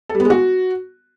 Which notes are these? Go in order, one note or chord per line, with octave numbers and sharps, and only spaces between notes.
A4
G3
B3
G#3
F#4